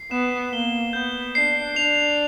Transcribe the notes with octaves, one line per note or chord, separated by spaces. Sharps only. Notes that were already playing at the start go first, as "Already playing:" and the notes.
Already playing: C7
B3 E7
A#3 G7
B3 G6
D4 C7
D4 F7